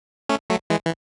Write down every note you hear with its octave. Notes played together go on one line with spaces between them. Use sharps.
A3 C#4
F#3 A3
E3 G#3
E3